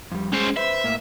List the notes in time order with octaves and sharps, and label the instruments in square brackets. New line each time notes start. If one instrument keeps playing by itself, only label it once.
[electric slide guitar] F2 G3
[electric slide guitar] G#3 G#4 [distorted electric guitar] C#4 C5
[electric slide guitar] B4 C5 [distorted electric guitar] E5
[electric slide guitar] A2 A#3 A#4